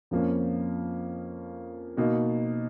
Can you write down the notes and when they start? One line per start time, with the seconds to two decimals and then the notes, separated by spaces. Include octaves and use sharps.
0.11 F2 F3 A#3 C#4
1.97 B2 A#3 D#4